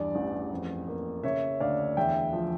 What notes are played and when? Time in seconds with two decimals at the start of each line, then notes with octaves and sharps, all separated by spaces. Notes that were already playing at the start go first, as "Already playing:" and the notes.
Already playing: E2 G2 D5
0.15 A1
0.51 F2
0.88 A#3
1.23 C#3 C#5 E5
1.60 D2 D5 F5
1.97 E2 E5 G5
2.33 F3